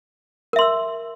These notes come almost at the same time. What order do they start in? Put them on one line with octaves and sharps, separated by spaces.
A#4 E5 C6 E6